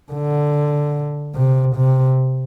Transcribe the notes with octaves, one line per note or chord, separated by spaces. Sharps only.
D3
C3
C3